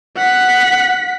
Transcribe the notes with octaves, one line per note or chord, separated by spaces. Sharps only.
F#5 B6